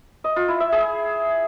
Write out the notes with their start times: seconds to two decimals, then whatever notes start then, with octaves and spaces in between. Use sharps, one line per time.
0.24 D#5
0.36 F4
0.48 E4
0.60 E5
0.72 G#4